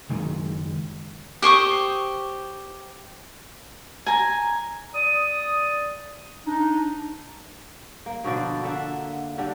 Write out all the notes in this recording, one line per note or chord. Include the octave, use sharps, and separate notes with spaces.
F#1 D#3 G#3
G4 C5 C#6 D#6
G#5 A#5
D5 D#6
D4 D#4
A#3
B2 D3 F3 D5
D3 A#3 E5 F#5
D3 G3 D4